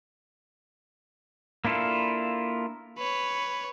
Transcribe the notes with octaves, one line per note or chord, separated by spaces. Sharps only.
A#3 D4 E4 F4 A4
B4 C#5